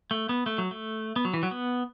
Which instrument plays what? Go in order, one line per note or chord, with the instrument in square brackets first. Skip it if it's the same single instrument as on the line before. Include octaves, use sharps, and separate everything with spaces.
[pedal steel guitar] A3
B3
A3
F#3
A3
B3
F#3
E3
F#3
B3